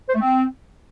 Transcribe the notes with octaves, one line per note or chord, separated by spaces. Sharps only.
C5
A3
C4